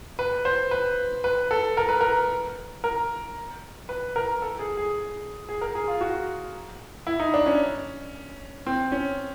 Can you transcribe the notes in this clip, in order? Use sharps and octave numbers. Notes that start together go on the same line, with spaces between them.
B4
C5
B4
B4
A4
A#4
B4
A#4
A#4
B4
A#4
A4
G#4
G#4
G#4
A#4
G#4
F4
F#4
E4
D#4
D4
C#4
C4
C#4